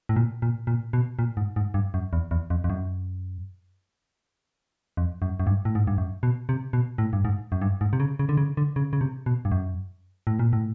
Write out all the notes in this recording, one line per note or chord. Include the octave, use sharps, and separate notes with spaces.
A2
A#2
A#2
A#2
B2
A#2
G#2
G#2
G2
F#2
E2
E2
F2
F2
F#2
F2
F#2
F#2
G2
A2
G#2
G2
F#2
B2
C3
B2
A2
G2
G#2
F#2
G2
G#2
C3
C#3
C#3
D3
C#3
D3
C#3
C#3
C3
B2
G2
F#2
A2
A#2
A2